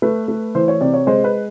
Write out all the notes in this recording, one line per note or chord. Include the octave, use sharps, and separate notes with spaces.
A3 B4
A3
E3 C5
C#5
C3 D5
C#5
G#3 C5
B4